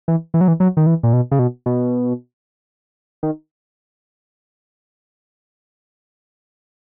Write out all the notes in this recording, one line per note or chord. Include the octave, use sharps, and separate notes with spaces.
E3
E3
F#3
E3
F#3
D#3
E3
A#2
B2
C#3
B2
B2
D#3